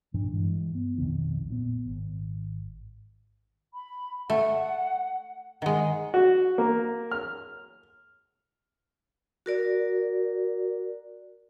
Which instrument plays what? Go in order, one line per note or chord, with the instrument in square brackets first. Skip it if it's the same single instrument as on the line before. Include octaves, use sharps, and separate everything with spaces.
[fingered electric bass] G2 A#2 F3 D4
G2 E3 G#3
B3
B1 F2 C3 D#3
A#2 B3
G#1
[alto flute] B5
[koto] A3 [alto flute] F#5
[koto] D#3 G#3 [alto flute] F#5
[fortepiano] F#4
A#3
F6
[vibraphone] F#4 A#4 D5